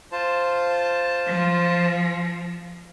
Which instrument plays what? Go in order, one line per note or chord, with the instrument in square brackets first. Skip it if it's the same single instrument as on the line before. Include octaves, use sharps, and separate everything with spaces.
[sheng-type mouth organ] F4 C5 A5
[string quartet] F3